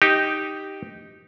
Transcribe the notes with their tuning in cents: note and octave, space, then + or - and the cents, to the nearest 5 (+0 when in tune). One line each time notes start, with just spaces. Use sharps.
D#4 +0 G4 +0